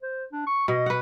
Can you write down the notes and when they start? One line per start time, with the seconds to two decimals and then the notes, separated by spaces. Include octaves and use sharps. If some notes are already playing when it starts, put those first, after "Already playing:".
0.02 C5
0.32 D4
0.47 C#6
0.68 B2 D#5
0.86 B4 F#5